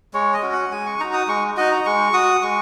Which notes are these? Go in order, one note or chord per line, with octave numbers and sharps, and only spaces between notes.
G#3 C#5
D#5
C#4 F#4
F#5
G#3 G#5
C#6
D#4 F#4 A#5
D#6
G#3 C#6
D#4 F#4 D#5
A#5
G#3 C#6
F#4 D#6
G#3 C#6